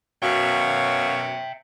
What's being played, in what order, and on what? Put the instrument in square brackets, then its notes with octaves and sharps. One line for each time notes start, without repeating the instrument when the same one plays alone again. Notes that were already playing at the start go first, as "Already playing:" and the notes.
[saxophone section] F#2 B2 C#5 [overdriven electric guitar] E5 G5 [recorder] F5